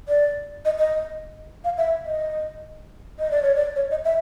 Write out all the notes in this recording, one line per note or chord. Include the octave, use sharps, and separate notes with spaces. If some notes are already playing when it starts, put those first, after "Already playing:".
D5
D#5
D#5
F5
E5
D#5
D#5
D5
C#5
D5
C#5
D#5
E5